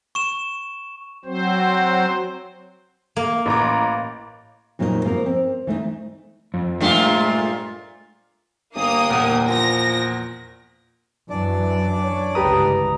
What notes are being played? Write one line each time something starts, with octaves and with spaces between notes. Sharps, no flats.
C#6 E7
F#3 C4 C5
A#3
A1 A#5 D6
F2 A#2 F#3 A#3 C4 D#4
F3 A#3 C4 A#4
C4
E3 A3 C4 D#4
F2
G2 A#2 G#3 A3 F4
G1 A#3 D#6
E2 A#2
F3 A#6
F#2 E3 F#3 D4 D5
C#5
G1 C#2 E3 G4 B4 A#5 D#6